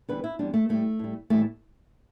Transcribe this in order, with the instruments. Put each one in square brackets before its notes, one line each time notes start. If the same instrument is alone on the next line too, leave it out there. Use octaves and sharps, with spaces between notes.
[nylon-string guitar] E2 D3 G3 B4
E4
E2 D3 G3 D4
A3
A2 G3 A3
A2 G3
A2 E3 G3 A3